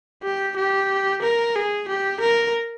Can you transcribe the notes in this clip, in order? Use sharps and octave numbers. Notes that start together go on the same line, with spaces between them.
G4
G4
A#4
G#4
G4
A#4